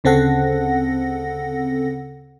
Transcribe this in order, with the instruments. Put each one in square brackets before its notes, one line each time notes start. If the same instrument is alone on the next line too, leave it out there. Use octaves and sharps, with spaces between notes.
[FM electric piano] D2 C#3 C4 A4 F#5 A#6